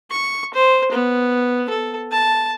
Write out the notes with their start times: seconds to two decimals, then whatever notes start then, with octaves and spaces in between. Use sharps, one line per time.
0.11 C#6
0.54 C5
0.92 B3
1.70 A4
2.12 A5